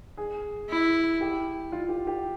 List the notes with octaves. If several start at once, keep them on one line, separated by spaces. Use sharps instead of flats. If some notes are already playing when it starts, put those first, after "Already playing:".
G#4
E4
G4
F4
G4
G4